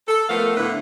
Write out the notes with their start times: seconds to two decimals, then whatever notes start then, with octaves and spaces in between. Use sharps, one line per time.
0.08 A4
0.29 F3 A3 B3 A4 A#4 F5
0.56 A2 D3 A3 B3 E4 B4